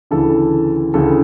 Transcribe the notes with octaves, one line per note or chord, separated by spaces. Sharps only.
D2 C#3 E3 A4
D2 C#3 E3 A4